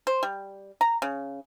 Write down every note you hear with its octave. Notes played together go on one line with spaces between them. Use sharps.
C5
G3
A#5
C#3